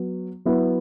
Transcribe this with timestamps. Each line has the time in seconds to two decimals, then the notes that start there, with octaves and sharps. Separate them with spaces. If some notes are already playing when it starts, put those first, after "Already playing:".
Already playing: F#3 B3
0.45 F#3 B3 E4